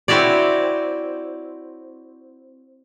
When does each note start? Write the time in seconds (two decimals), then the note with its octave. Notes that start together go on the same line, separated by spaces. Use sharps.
0.08 C4 E4 F#4 C#5 D5